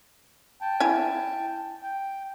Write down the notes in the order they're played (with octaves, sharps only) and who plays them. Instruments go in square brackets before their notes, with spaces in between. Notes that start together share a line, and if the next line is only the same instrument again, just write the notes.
[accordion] G5 A5
[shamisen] E4 E5 G#5
[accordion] G5